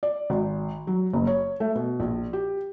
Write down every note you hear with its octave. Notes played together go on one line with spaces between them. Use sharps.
D5
G#1
F#3
F#1
C#5
A3
B2
A#1
G4